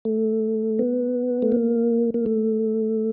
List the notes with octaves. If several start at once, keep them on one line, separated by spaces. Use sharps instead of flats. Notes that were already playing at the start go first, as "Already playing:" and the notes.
A3
B3
A3
A#3
A#3
A3